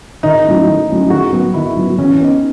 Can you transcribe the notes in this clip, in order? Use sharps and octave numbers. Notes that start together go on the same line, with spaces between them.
D#3 D#4
F#3 A3 C#4 E4
D#3
F#3 A3 C#4 E4
D#3 F#4
F#3 B3
D#3 E4
F#3 B3
E3 C#4
B3 D#4